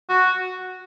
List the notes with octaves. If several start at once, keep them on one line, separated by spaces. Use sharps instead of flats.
F#4